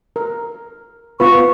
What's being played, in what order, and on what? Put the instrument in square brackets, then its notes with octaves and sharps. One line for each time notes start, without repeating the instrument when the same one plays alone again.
[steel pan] A#4
[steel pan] B3 F4 B4 [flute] C#6